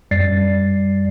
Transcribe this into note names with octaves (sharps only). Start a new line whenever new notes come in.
F#2 G3 D5 A6 C7